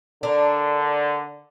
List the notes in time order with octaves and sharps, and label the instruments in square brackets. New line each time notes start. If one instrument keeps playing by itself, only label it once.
[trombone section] D3 [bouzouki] D4 A#4